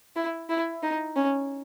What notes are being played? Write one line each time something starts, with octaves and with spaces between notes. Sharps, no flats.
E4
E4
D#4
C#4